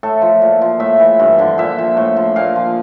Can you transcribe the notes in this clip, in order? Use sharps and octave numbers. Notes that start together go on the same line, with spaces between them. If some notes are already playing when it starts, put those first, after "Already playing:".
A2 A4
F3
A#2
F3
A2 E5
E3
G2
D3 F3
A#2 E5
F3
A2
F3
A#2 F5
F3